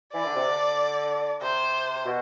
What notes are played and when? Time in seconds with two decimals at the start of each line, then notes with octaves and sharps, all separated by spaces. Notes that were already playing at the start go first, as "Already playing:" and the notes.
0.14 E3 D5
0.25 D3
0.36 C3
0.47 D3
1.41 C3 C5
2.06 B2